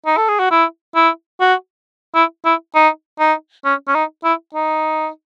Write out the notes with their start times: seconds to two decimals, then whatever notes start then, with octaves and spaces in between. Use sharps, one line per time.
0.06 D#4
0.17 A4
0.28 G#4
0.40 F#4
0.51 E4
0.95 E4
1.40 F#4
2.15 E4
2.45 E4
2.75 D#4
3.20 D#4
3.65 C#4
3.88 C#4
3.95 D#4
4.24 E4
4.55 D#4